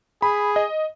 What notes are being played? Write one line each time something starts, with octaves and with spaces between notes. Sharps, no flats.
G#4 B5
D#5